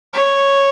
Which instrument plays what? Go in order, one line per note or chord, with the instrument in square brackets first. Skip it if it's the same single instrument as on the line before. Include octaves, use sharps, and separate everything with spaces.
[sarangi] C#5